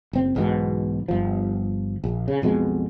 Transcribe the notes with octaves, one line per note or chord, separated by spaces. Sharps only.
F#1 C4
B1 E2 G#2 B2
G1 F3
A#1
C#3
B1 F2 B2 G#3